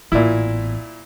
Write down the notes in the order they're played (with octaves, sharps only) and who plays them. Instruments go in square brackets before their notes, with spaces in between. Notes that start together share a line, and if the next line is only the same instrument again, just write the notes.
[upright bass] A1 B3 [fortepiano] A#2 E4